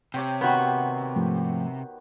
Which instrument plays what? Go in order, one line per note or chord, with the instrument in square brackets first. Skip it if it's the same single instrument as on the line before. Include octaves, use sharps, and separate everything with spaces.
[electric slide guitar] C3 [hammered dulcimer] G4 C#5 G5
[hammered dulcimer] D#3 B5 C6 [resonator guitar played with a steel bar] B3 F#4
[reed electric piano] G#2 F3 A3